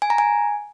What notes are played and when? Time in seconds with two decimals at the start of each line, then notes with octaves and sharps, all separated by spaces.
0.02 G#5
0.10 A#5
0.18 G#5